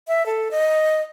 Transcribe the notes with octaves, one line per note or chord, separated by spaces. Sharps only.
E5
A4
D#5